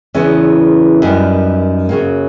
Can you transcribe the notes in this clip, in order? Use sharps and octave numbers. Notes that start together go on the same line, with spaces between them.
E2 C#3 E3
F#2 D#3 G3 B3
F#2 C#3 F#3 A#3